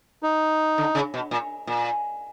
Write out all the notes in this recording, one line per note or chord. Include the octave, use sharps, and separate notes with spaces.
D#4
D3
C#3
B2
A#2
A#2